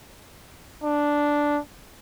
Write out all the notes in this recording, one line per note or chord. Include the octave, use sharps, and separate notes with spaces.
D4